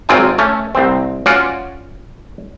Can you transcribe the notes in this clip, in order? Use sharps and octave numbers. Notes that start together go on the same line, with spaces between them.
G#1 F#3 C4 F4 D5 G#5
A3 C#4
C2 C4
C#4 F4 F#4 D5